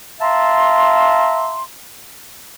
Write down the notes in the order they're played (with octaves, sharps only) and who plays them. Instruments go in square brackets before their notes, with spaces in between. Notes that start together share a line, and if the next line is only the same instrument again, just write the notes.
[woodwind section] E5 F5 A5 A#5 C6